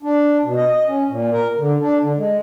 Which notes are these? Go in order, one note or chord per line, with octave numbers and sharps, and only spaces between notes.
D4
B2
D#5
D#5
C#4
A#2
A#4
D3
D4
D3
G#3